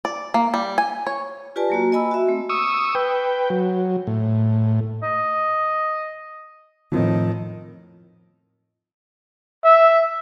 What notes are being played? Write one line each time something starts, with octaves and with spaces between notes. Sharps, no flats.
D5
A#3
G3
G#5
C#5
F4 G4 B4 D5 G#5 A5
F#3 A#3 F#4
A#3 D#5 G#5 B5 E6
F#4 E5
A3 C4
C#6 D#6 E6
B4 G5
F#3
A2
D#5
F2 A2 D#3 F3
E5